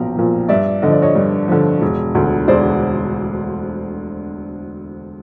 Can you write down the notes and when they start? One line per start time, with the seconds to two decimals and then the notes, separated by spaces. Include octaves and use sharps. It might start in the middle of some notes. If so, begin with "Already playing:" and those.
Already playing: B1 A#2 F3 G5 A#5
0.16 A#2 F3
0.49 G2 D5 E5
0.82 D3 F3 D#5
0.92 D5
1.02 C#5 D#5
1.15 G2
1.48 D3 F3
1.82 E1
2.15 D2 D3
2.48 E1 C5 D5